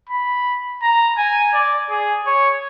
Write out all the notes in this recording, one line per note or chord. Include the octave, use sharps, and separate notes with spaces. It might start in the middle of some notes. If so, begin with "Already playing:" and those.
B5
A#5
G#5
D5
G#4
C#5